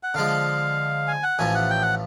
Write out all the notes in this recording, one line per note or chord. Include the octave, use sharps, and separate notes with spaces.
F#5
D3 F3 G#3 F5
G#5
F#5
A1 A2 F3 G#5
F#5
G5
F#5